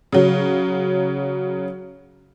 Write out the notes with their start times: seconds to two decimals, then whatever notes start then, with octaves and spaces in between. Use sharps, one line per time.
0.12 C#3 F#3